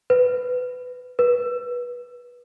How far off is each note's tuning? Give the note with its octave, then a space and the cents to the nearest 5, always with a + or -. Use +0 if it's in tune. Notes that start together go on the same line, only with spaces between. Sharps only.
B4 +15
B4 -20